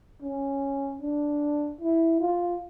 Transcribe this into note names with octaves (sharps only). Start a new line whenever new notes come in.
C#4
D4
E4
F4